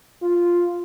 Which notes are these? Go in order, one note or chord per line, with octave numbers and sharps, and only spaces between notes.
F4